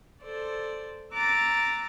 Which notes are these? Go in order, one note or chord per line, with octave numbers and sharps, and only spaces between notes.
A4 C5 D5
A#5 D6 E6 F#6 A6